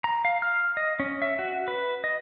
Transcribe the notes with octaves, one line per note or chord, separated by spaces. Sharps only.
A#5
F5
F6
D#5
C#4
E5
F#4
B4
D#5